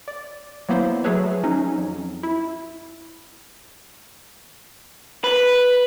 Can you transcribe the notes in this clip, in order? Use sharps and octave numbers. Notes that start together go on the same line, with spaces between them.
D5
F#3 A#3 B3 E4 C5
F#3 A3 G#4 A4 B4 C#5
F#3 C#4 D#4
F2
E4
B4